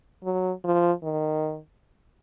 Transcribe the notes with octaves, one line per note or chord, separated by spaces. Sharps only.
F#3
F3
D#3